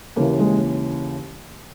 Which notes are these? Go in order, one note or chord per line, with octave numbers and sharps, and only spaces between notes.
D#2 C#3 E3 A#3
G#3